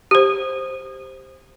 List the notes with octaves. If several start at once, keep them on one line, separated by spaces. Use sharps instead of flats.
G4 C5